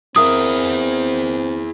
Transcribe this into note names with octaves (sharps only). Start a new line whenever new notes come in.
A#3 C4 E4 G#4 A#4 E5 D#6